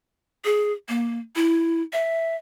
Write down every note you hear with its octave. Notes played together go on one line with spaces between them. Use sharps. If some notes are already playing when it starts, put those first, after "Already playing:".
G#4
A#3
E4
E5